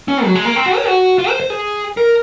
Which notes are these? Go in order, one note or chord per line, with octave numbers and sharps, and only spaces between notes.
C#4
F#3
G#3
A#3
C4
F#4
C#5
F#4
F4
C5
C5
G#4
A#4